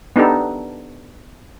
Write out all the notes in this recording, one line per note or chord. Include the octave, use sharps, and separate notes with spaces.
B3 D4 D#4 G4 A4